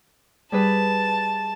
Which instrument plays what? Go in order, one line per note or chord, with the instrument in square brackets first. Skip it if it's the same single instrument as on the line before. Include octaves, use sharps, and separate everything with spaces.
[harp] G3 G#4 B4 [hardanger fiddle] A5